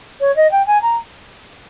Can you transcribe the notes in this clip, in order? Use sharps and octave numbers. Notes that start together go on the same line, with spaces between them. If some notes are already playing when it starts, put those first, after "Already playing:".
C#5
D#5
G5
G#5
A#5